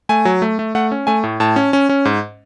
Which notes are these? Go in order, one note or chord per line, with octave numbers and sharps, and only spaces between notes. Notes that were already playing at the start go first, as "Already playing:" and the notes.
A3 G#5
F#3
A3
A3
A3 F#5
C#4
A3 G#5
A2
A2 A5
C#4
C#4
C#4
G#2